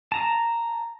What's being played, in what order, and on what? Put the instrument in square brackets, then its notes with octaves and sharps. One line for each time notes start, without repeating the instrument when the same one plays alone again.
[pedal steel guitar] A5 A#5